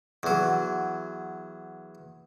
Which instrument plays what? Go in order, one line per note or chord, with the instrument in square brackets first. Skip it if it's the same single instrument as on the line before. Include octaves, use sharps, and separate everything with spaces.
[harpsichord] E2 F#3